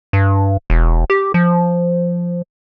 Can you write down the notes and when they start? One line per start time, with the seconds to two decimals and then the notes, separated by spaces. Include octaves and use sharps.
0.13 G2
0.70 E1
1.10 G4
1.34 F3